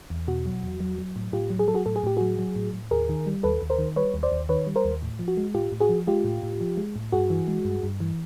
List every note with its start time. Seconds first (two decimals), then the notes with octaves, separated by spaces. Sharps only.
0.10 E2
0.28 B2 F#4
0.46 F#3
0.63 E2
0.80 F#3
0.98 F#3
1.16 A2
1.33 A2 F4 G4
1.50 F#3
1.59 G#4
1.68 F#3 A4
1.74 F#4 G#4
1.86 A2 A4
1.96 G#4
2.04 A2 G4
2.17 F#3 F#4 G#4
2.39 F#3
2.56 A2
2.74 A2
2.91 D#2 G#4 A#4
3.09 D#3
3.26 G3
3.43 D#2 A4 B4
3.62 D#2
3.70 A#4 C5
3.78 D#3
3.96 G3 B4 C#5
4.14 D#2
4.23 C5 D5
4.32 D#2
4.49 D#3 B4 C#5
4.67 G3
4.76 A#4 C5
4.85 D#2
5.02 A2
5.19 F3
5.28 F#4
5.37 G#3
5.55 A2 F4 G4
5.72 A2
5.80 F#4 G#4
5.89 F3
6.07 G#3 F4 G4
6.24 A2
6.43 A2
6.61 F3
6.77 G#3
6.96 A2
7.12 G2 F#4 G#4
7.30 E3
7.48 G#3
7.65 G2
7.83 G2
8.00 E3